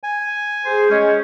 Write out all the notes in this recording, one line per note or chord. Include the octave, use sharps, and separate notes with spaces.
G#5
G#4 C5
G#3 C#4